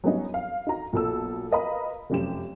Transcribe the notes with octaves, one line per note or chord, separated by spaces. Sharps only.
F#3 G3 B3 C#4 D#4
F5
D#4 F#4 A#5
B1 A#2 A4 E6
A#4 B4 D#5 F5 A#5 B5
F1 F#2 G4 E7